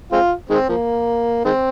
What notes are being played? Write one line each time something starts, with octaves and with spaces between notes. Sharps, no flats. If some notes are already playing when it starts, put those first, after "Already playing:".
G#3 C4 F4
D#3 G#3 C4
F3 A#3
D#3 G#3 C4